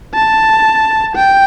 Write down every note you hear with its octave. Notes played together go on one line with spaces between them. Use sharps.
A5
G5